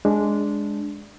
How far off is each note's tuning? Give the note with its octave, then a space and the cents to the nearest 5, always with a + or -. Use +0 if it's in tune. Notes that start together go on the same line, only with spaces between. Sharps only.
G#3 +0 D4 -10